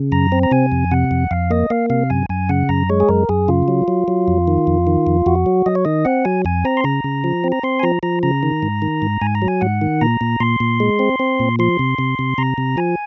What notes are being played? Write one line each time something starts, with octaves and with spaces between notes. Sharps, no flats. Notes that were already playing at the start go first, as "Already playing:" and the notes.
Already playing: C#3
F#2 A#5
C4
A#5
C3 G#5
F2
C3 F#5
F2
F2 F5
A#3 D#5
A#3 F5
C3 F5
F#2 G#5
F#2 G#5
C#3 F#5
F#2 A#5
G#3 C#5
G#4
F#2 A#4
F#2 G#4
C#3 F4
F#3
F#3
F#3
F2
D#3
F2
D#3
F2
F2 F#4
F#3
F#3 D#5
C#5
D#3 D#5
C4 F#5
F#3 G#5
F2 G#5
C4 A#5
C6
C#3 A#5
C#3
F3
C4
A#5
C4 C6
G#5
F3 A#5
F3 A#5
C#3 A#5
D#3
G#2
D#3
G#2
G#2 G#5
A#5
F#3
G#5
G#2 F#5
D#3
A#2 A#5
A#2
A#2 C6
A#2
G#3
C4
C4
A#2
F3 C6
C3
C3
C3
C3 A#5
C3
F3 G#5